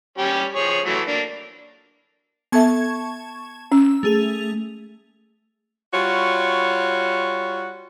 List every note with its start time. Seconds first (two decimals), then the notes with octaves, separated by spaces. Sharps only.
0.18 G3 C#4 G4
0.56 F3 G#4 C#5
0.86 E3 F#3 A3
1.07 A#3 D4
2.52 B3 A4 E5 A5 C#6 G#6
3.72 C#4 E6
4.03 A3 G#4 F7
5.94 G3 F4 F#4 C#5